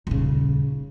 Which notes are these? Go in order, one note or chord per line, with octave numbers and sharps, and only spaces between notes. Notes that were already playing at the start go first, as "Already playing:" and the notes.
D#1 C#3